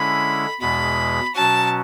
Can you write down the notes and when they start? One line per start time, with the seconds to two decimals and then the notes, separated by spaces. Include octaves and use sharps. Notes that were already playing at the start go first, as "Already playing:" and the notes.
Already playing: D3 G#3 C#4 E4 B5
0.61 E2 B2 G#3 B5
1.35 B2 F#3 C#4 F#4 A5